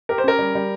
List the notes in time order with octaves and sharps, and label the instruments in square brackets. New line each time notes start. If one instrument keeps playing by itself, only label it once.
[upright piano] G4 [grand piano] A#4
[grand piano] C5
[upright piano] C#4 [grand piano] A#4
[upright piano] G3
G3